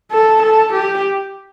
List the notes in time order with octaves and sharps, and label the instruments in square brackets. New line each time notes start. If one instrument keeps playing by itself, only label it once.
[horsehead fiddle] A4
A4
G4